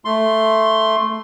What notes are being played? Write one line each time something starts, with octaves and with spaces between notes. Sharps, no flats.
A3 C6